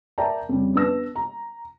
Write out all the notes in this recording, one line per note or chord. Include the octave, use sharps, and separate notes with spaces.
A#4 D5 E5 G5 A5 A#5
F2 C#3 G3
B3 D4 B4 E6 A#6
A#5